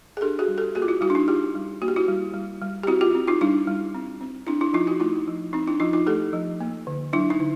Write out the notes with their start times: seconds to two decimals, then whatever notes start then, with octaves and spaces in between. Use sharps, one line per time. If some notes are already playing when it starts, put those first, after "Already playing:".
0.17 G#4
0.21 D4 G4 A4
0.39 F#4 G#4
0.48 G3
0.58 G4 A4
0.75 A#3 F#4 G#4
0.82 F4
0.88 E4 F#4
1.01 G3 E4 F#4
1.10 D4
1.15 D#4
1.27 D4 F4 G4
1.55 G3
1.82 A#3 F#4
1.88 G4
1.96 E4 F#4
2.08 G3
2.34 G3
2.62 G3
2.83 G4
2.87 C4 E4 F#4
3.01 F4 G4
3.15 C4
3.27 D#4 F4
3.41 G3 D4 E4
3.67 G3
3.95 C4
4.21 C4
4.47 C4 D4 E4
4.61 D4 E4
4.73 F3 D#4 F4
4.87 E4 F#4
5.00 A3 D#4 F4
5.28 F3
5.53 C4 D#4
5.67 D4 E4
5.80 F3 D#4 F4
5.93 D#4 F4
6.07 A3 G4 A4
6.33 F3
6.61 A#3
6.87 D3
7.13 F#3 D4 E4
7.30 D#4
7.40 D3